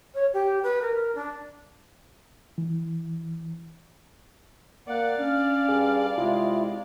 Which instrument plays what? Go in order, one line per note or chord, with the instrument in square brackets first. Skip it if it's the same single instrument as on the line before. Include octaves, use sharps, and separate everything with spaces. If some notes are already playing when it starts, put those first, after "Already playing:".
[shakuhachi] C#5
G4
B4
A#4
D4
[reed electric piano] E3
[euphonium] A#3 [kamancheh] D5 F5 [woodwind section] F#5
[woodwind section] C#4 F6 [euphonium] D4
[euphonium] G2 [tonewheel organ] G#4
[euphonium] C3 [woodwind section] G#3 [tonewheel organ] E4 F4